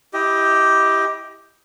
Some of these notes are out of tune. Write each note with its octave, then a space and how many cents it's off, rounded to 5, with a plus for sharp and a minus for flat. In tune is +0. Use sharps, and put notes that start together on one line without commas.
E4 +0 G4 +0 D#5 +20